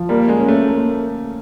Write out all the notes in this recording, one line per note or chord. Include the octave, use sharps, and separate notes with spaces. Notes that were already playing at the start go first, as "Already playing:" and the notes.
Already playing: F3
G3 A#3
G#3
C#4
A3
A#3